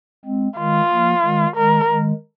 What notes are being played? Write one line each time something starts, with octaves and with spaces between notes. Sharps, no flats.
G#3 C4
D#3 G#3 F4
F3 A#3
D#3 G#3
D#3 G#3 A#4
D#3 G#3